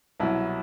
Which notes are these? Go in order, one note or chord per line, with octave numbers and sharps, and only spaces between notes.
C2 B2 F#3 E4